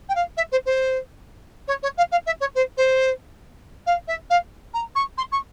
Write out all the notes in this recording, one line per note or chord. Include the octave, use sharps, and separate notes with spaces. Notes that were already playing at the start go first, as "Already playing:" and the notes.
G5
F5
E5
C5
C5
C#5
C#5
F5
F5
E5
C#5
C5
C5
F5
E5
F5
A#5
C#6
C6
C#6